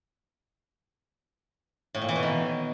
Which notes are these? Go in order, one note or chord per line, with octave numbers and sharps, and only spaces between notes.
A2
A#2
E3
B2
D#3